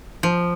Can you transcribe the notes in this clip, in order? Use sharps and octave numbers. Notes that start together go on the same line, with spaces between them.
F3